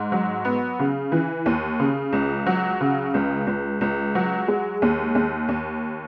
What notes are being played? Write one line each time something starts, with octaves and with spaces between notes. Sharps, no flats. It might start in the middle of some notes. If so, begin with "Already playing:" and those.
Already playing: G#2
F#3
B3
C#3
E3
D#2
C#3
C#2
F#3
C#3
C#2
C#2
C#2
F#3
G#3
D#2
D#2
D#2